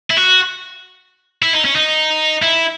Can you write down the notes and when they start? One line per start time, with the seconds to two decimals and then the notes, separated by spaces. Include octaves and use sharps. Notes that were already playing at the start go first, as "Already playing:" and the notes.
0.11 E4
0.17 F#4
1.42 E4
1.53 D#4
1.65 C#4
1.76 D#4
2.42 E4